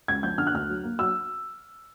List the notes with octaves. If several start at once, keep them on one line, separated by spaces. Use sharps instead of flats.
C#2 G#6
F3 G6
D3 F6
F#6
D2 F6
F#3
A#3
F#3 E6